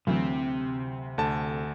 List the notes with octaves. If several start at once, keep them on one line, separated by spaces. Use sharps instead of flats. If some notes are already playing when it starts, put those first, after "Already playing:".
D2 C3 E3 F#3 C4
D2 D3 A5